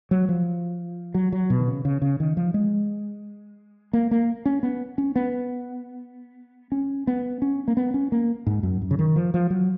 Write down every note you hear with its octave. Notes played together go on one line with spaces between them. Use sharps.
F#3
F3
F#3
F#3
B2
D#3
C#3
C#3
C#3
D#3
F3
G#3
A#3
A#3
C#4
B3
C#4
B3
C#4
B3
C#4
A#3
B3
C#4
A#3
G#2
F#2
F#2
C#3
D#3
F3
F3
F#3